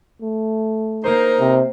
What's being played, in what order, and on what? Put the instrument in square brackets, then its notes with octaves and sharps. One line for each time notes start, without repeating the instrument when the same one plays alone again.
[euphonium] A3
[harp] A#3 C5 [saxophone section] D#4 A#4
[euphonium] C3